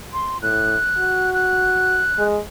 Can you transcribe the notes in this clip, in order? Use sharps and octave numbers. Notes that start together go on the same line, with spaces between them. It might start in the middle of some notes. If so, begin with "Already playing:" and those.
C6
A2 F#6
F#4
F#6
G#3